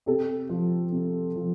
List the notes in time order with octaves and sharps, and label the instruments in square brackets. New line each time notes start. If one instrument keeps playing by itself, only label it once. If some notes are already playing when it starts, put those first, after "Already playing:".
[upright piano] C3 G4 A4
F3
C3
F3